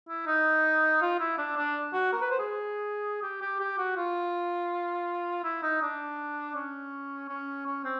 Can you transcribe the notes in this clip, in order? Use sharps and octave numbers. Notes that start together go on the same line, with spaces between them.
E4
D#4
F4
E4
D4
D4
F#4
A#4
B4
C5
G#4
G4
G4
G4
F#4
F4
E4
D#4
D4
C#4
C#4
C#4
C4